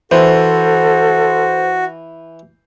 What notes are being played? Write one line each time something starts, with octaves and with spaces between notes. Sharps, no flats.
E3 F#4 A4 C5